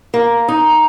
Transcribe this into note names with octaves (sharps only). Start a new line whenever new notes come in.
A#3
D#4